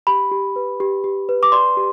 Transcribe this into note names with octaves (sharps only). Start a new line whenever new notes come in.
G4 B5
G4
B4
G4
G4
B4
D6
D5 C6
G4